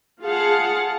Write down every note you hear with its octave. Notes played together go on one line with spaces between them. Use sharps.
F4 G#4 F5 F#5 A5